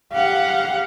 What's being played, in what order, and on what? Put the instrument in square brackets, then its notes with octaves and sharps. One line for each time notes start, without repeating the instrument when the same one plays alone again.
[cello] G4 F#5 [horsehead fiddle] F5